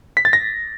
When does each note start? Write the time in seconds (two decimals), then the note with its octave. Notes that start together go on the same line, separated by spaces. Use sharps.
0.17 B6
0.25 A6
0.33 A#6